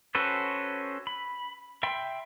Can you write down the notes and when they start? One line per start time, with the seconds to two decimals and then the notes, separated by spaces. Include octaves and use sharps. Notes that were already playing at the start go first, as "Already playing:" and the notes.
0.15 C#4 F#4 A4 B4 C5
1.07 B5
1.83 E5 G5 B5 C6